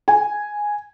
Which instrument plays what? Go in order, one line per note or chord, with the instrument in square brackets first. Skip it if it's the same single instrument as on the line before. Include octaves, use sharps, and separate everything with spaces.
[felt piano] G#5